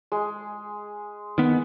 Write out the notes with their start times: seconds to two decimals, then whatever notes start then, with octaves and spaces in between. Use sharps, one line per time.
0.12 G#3
1.38 D#3 B3